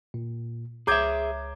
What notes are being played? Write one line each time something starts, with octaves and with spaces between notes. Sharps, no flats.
A#2
C#2 G#4 C#5 E5 A#5 D6 G6 G#6